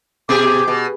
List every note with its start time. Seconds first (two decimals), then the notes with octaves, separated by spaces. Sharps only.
0.29 B2 G4 G#4 D6
0.68 B2